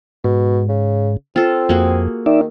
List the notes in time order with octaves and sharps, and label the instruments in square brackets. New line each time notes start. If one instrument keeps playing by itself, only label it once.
[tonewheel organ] G#2 [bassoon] B2
[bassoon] C#3
[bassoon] C4 [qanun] F4 A4
[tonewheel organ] F2 [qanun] A#3 F#4 G#4
[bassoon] D#3 [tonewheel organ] D#4 D5 E5